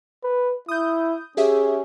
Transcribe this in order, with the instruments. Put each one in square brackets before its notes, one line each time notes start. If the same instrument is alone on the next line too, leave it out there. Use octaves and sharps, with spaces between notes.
[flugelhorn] B4
[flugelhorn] E4 [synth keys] D#6 G6
[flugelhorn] C#4 [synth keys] G4 G#4 E5